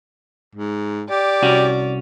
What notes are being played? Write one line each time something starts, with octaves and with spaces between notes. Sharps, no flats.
G#2
G4 D5
C2 C#4 F#4